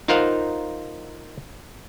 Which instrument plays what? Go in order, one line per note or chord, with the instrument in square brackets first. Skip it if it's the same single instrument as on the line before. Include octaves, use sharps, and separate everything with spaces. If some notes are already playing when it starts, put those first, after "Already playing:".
[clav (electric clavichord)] D#4 F4 A#4 C5 F5 F#5